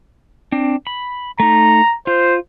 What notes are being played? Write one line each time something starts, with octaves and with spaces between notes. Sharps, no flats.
C4 D4
B5
A3 D#4 A#5
F4 C5